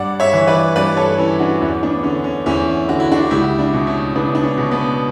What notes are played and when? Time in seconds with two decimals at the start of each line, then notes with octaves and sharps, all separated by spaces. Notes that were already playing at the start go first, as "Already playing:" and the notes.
Already playing: G2 D5 F#5
0.20 C#5 E5
0.33 E3
0.47 B4 D5
0.76 G2 B4 D5
0.97 A4 C#5
1.18 E3 C#4 E4
1.39 D4 F#4
1.61 E2 C#4 E4
1.83 B3 D4
2.03 D3 C#4
2.24 C#4
2.46 E2 C#4 E4
2.88 D3 F#4
3.00 E4
3.12 D4 F#4
3.30 C#2 E4 G4
3.59 D4 F#4
3.74 B2
3.87 C#4 E4
4.15 C#2 B3 D4
4.35 D4
4.44 C#4
4.58 B2
4.71 B3